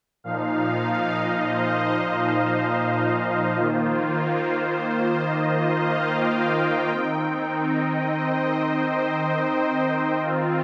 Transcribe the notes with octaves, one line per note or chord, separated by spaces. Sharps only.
A#2 F3 D#4 F5
D#5
C5
C5
D#3 A#3 F4
C5
D#5
F5
G5
D#3 C4 D#4
D#5
C5
C5
D#3 C4 F4